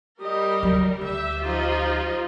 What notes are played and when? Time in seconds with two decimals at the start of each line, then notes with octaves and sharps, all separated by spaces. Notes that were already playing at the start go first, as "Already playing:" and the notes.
0.21 G3 G4 A#4 D#5
0.63 D2 F#3
1.01 D2 G4 E5
1.41 F3 D#4 F4